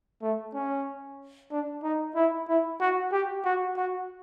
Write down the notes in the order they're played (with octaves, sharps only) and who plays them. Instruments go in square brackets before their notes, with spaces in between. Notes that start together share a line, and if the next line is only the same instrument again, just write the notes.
[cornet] A3
C#4
D4
D#4
E4
E4
F#4
G4
F#4
F#4